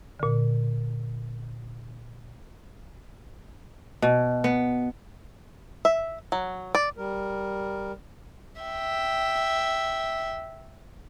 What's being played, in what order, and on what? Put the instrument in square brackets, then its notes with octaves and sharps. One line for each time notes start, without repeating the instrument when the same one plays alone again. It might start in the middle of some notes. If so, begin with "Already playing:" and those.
[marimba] A#2 D3
[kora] B2
B3
[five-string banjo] E5
F#3
D5
[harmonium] G3 A#4
[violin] E5 G5